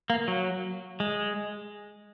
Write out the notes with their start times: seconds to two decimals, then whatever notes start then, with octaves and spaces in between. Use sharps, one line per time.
0.10 A#3
0.28 F#3
1.00 G#3